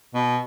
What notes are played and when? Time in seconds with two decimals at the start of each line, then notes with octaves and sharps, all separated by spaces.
0.14 B2